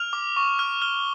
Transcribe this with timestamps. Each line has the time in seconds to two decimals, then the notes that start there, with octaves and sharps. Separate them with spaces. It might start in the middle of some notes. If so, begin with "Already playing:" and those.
Already playing: F6 F7
0.13 D6
0.36 C#6
0.59 F6
0.82 F6 G7